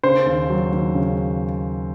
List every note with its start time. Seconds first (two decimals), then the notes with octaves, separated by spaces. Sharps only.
0.03 C#3 C5
0.26 D#2
0.49 F#3
0.72 D#2
0.94 C#3